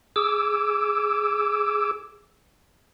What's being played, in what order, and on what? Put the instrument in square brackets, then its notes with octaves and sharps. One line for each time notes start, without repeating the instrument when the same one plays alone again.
[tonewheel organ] G#4 D6 E6